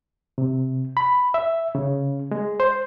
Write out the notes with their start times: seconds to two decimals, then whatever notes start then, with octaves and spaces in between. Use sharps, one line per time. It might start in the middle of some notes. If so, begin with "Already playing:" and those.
0.38 C3
0.97 B5
1.34 E5
1.75 C#3
2.31 G#3
2.60 C5